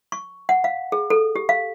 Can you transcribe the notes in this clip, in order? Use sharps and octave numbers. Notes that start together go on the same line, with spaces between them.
C#6
F#5
F5
G#4
A4
G4
F5